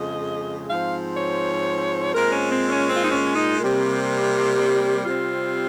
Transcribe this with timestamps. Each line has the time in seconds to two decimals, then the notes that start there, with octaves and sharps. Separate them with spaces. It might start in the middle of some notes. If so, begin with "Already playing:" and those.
Already playing: F2 C#3 G#3 D#5
0.69 G#2 F3 C4 F5
1.17 C#5
2.14 A#2 G#3 C4 A#4
2.32 C#4
2.51 C4
2.69 C#4
2.87 C4
2.97 F4
3.04 D#4
3.12 C#4
3.36 D#4
3.60 C3 G3 A#3
5.05 C3 G3 C4 F4